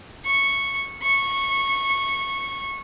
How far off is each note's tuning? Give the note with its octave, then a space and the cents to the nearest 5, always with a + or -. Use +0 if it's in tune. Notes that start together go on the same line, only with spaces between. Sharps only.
C#6 -5
C#6 -15